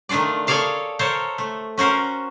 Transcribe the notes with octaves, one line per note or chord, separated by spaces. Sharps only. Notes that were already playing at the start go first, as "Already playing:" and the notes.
D#3 A3 D4 F4 D5
G#4 A4 C#5 D5 F5 A5
A4 A#4 C5 C#5 A5
A3
C#4 F#4 A#4 C5